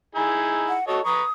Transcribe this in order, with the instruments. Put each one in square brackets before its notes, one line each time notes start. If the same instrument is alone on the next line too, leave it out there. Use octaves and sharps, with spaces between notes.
[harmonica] D#4 E4 G#4
[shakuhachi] F#5
[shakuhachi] F#4 [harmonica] A4 C#5 D#5
[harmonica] B4 A#5 C#6 [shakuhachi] D#6